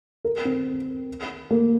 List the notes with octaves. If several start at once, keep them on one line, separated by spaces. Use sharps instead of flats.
A#4
C4
A#3